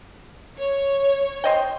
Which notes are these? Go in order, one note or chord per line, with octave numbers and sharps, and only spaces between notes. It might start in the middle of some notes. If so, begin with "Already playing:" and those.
C#5
C5 D#5 G5